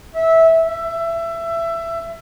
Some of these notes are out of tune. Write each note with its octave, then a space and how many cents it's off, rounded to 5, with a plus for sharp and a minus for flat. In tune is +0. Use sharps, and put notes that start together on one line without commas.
E5 -15
E5 +20